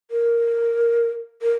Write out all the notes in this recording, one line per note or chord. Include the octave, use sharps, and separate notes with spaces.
A#4
A#4